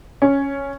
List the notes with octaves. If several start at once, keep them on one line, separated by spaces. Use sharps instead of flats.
C#4